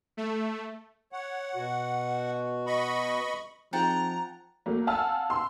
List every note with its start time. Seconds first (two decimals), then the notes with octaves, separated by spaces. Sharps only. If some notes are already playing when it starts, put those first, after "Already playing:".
0.17 A3
1.12 C#5 F#5
1.55 B2 F#4
2.66 D#5 B5 C#6
3.73 F3 C4 D#4 G#4 F#5 G5 A5 A#5
4.66 F#3 A3 A#3
4.87 F5 F#5 G#5 A5 E6 F6
5.30 C6 E6